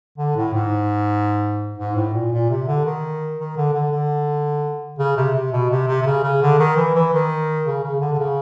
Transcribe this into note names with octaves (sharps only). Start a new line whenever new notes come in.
D3
A2
G#2
G#2
A2
A#2
A#2
C3
D3
D#3
D#3
D3
D3
D3
C#3
C3
C3
B2
C3
C3
C3
C#3
C#3
D3
D#3
E3
E3
D#3
C#3
C#3
D3
D3
C#3